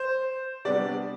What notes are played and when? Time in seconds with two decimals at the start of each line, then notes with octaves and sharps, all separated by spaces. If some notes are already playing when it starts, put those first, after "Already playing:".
Already playing: C5
0.65 C3 G3 B3 D4 D5